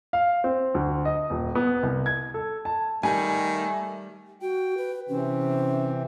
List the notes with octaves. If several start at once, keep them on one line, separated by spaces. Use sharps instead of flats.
F5
C4
D2
D#5
D#1
B3
C2
G#6
A4
A5
D#3 G3 A3 G#5
F#4 G5
B4
C3 E3 C4 C#4